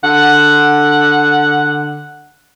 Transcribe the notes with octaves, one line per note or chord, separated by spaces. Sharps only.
D3 F#5